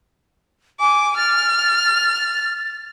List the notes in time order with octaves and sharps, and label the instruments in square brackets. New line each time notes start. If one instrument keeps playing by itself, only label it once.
[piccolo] G#5 [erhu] D6
[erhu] F6 [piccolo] A6